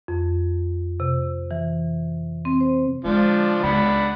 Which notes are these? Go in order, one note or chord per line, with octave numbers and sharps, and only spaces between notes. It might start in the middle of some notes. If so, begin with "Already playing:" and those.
F2
C3
E3
C4
C5
D3 F3 G#3 D4
C#2 D4 F#5 B5